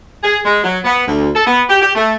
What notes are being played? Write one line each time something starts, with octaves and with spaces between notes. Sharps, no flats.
G#4
G#3
F#3
B3
D2
A4
B3
G4
G4
A3